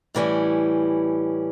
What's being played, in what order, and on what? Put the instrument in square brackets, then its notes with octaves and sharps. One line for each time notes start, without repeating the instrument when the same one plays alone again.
[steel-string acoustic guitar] A2 E3 G3 C#4